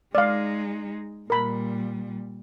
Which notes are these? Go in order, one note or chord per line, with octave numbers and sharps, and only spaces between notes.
G#3 D#4 D5 F5
A#2 G3 A#4 B5